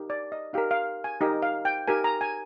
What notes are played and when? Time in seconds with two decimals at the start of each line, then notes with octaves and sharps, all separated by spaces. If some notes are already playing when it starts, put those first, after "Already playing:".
Already playing: D#4 G4 A#4
0.10 D5
0.32 D#5
0.53 D#4 G4 A#4 F5
0.71 F5
1.04 G#5
1.21 D#4 G4 A#4 D#5
1.42 F5
1.65 G5
1.88 D#4 G4 A#4 G#5
2.04 A#5
2.21 G#5